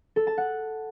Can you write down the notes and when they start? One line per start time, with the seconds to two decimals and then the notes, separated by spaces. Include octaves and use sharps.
0.16 A4
0.27 A5
0.38 F#5